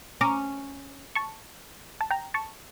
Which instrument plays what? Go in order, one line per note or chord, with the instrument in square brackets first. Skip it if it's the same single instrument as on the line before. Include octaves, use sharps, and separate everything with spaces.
[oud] C#4 [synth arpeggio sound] A#5 D6
[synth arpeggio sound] A5 C#6
A5
G5 A#5
A5 C#6